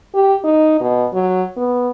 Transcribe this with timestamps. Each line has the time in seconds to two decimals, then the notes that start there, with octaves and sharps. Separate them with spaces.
0.14 G4
0.44 D#4
0.80 B2
1.13 F#3
1.57 B3